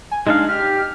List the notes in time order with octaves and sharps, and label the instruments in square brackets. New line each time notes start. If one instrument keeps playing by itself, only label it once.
[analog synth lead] G#5
[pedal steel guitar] G#3 D4 F5 [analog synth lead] D#4
[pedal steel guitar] G4 [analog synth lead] F6